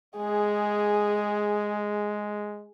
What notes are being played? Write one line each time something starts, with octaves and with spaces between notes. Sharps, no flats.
G#3 G#4